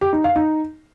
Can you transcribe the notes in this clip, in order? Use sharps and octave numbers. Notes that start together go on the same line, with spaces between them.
G4
D#4
F5
D#4